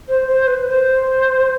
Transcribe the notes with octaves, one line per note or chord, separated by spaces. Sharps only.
C5
C5
B4
C5